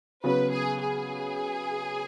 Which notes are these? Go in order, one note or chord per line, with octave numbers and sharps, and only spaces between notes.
C#3 F#3 B3 B4
G#4
G#4